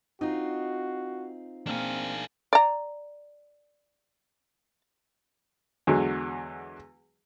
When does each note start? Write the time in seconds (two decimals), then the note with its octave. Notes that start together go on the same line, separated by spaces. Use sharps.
0.21 C4 D#4 F4 F#4
1.67 A#3 C4 D4 G#4 F6
2.53 D5 A#5
5.87 E2 D3 F#3 G#3